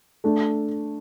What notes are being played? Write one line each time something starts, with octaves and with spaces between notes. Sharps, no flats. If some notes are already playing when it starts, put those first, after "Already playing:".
A3 D4